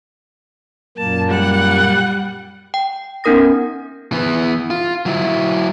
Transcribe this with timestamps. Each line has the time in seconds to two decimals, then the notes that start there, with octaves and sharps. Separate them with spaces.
0.98 F#2 A#2 A#3 A5
1.28 G3 F#5
2.74 G5
3.24 B3 C#4 D#4 A#4 D#6 A#6
4.12 E3 B3
4.70 F4
5.06 F#3 E4